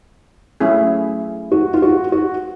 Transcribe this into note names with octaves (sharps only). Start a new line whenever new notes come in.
F#3 A3 C#4 E4 G#4
F#4
F4
F#4
F#4